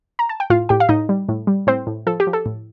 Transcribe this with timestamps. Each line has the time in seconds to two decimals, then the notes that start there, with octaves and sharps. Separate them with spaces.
0.19 A#5
0.29 A5
0.40 G5
0.50 A2 F4 F5
0.69 A2 G4 G5
0.80 F5
0.89 A2 D#4 D#5
1.09 G3
1.29 A2
1.47 G3
1.67 A2 C4 C5
1.87 A2
2.06 F3 A4
2.20 G4
2.27 F3
2.33 A4
2.46 A2